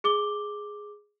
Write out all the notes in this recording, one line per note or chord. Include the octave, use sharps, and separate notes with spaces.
G#4 D6 G7